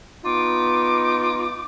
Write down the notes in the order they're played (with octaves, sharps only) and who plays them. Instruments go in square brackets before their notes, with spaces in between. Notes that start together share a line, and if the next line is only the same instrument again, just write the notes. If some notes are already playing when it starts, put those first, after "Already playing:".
[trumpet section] B3 D#4 [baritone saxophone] F4 [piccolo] D6